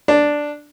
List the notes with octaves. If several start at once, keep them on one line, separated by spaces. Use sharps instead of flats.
D4